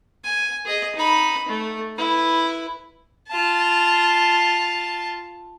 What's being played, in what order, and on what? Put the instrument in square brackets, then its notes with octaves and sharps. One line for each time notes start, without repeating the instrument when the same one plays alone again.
[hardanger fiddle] G#5
G#4 D#5
D#4 B5
A3
E4 B4
F4 A5